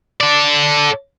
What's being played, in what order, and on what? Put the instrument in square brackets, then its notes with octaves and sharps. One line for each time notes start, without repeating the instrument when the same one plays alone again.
[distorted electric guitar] A4 D5